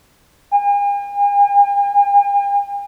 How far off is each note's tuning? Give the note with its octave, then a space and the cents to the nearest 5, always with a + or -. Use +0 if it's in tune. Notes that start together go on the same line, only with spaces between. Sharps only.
G#5 -45